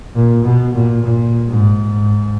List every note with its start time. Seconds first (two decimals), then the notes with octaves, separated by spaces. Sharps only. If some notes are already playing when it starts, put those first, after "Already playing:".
0.15 A#2
0.44 B2
0.74 A#2
1.03 A#2
1.48 G#2